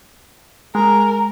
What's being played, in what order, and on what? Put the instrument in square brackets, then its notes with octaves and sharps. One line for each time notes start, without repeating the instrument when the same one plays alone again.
[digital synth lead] G#3 [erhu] A#4